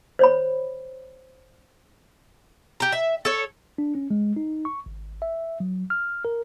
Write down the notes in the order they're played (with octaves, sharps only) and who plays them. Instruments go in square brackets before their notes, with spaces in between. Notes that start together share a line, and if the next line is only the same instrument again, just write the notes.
[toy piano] C5 C#5 B5
[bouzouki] G4 A#5
E5
A4 C#5
[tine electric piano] D4
C#4
G#3
D#4
C#6
G#1
E5
F#3
F6
A#4